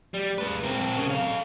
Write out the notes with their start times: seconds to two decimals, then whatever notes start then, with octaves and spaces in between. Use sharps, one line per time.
0.14 G3
0.38 G#3 B4
0.64 C4 A#4
0.98 C#3
1.10 A4 F5